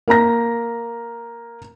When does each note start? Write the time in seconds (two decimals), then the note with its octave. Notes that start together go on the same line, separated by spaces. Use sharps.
0.08 A#3 A#4 A#5 A#6